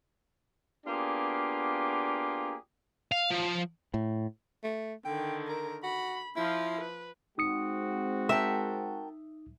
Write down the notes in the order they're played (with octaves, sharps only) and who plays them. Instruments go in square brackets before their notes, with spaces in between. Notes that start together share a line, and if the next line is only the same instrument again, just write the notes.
[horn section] A#3 B3 D4 F4 G4 G#4
[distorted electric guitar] F5
F3
[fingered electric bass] A2
[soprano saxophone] A3
[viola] D3 D#3 [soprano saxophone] G5
[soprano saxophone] A#4
[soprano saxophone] F#4 [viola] B5
[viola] F3 F4 [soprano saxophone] E4
[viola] B4
[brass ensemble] G#3 C4 F#4 [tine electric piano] D#4 D#6 C#7
[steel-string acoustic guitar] A#4 G5 A5 [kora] E5